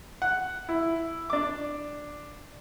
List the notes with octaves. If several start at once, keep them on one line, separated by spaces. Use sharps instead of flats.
F#5
E4
D4 D6